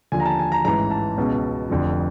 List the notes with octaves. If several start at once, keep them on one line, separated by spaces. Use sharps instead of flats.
D#2 D3 F3 G#5
A#5
A5
G#5
A#5
A1 G#2 E3 A#5
A5
C#2 B2
F1 F2 D3 F3